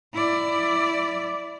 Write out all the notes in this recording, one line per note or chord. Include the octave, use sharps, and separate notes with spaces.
E4 D5